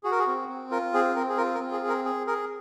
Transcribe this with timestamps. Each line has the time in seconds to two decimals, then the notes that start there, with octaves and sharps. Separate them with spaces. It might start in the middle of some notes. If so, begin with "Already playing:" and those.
0.03 F#4 G#4
0.12 A#4
0.19 G#4
0.27 C4
0.49 C4
0.71 F4 A#4
0.94 C4 G#4
1.16 C4 A#4
1.29 G#4
1.37 F4 A#4
1.55 A#4
1.60 C4
1.72 G#4
1.83 G#4
1.88 A#4
2.05 G#4
2.27 G#4 A#4